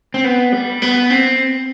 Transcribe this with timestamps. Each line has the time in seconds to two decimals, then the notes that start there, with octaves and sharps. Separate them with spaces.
0.14 C4
0.24 B3
0.52 G3
0.82 B3
1.10 C4